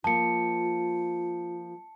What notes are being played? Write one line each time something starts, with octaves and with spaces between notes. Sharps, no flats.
F3 A#3 F4 A5 C#7